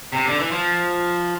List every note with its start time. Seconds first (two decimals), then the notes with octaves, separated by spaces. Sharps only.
0.12 C3
0.25 D3
0.39 E3
0.51 F3